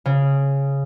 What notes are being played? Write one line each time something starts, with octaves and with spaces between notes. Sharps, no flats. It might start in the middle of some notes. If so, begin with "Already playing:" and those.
C#3